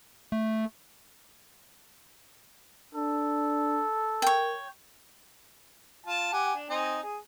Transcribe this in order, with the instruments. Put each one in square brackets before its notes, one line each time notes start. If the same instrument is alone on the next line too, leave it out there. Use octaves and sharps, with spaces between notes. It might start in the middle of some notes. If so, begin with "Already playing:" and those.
[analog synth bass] A3
[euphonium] D4 [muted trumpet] A4
[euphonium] A#4 [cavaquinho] C#5 G5
[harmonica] F4 A5
G4 F#5 G#5
D4
C4 D#4 G#5
G#4